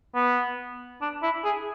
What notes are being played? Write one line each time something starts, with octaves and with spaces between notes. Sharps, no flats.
B3
D4
E4
G#4